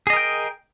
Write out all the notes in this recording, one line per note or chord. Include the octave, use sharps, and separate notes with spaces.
G#4 A#4 D#5 G5